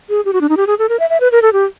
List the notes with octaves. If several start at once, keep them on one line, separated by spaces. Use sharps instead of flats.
G#4
G4
F#4
D4
D#4
G4
G#4
A4
A#4
E5
E5
B4
A#4
A4
G4